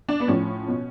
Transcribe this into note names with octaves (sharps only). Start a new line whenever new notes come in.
D4
B3
A2 F3 C#4
B2